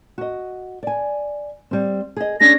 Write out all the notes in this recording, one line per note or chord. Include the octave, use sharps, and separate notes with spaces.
F#4 D#5
D5 G#5
G3 C4
G#4 D#5
C#4 D4 G#4 A#6